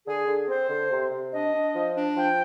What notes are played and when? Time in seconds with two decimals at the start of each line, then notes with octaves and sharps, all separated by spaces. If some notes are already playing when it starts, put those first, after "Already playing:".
0.05 D3 G#4
0.26 D3
0.47 C4 C5
0.69 D3
0.90 C3
1.11 C3
1.32 D4 D#5
1.53 D4
1.74 F3
1.96 D4
2.16 F3 G5